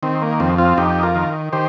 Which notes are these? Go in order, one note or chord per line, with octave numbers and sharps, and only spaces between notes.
D#3 C4
A#3
F2 C4
C4 F4
F2 D#4 G4
F4 A#4
D#3
D#3 G4 C5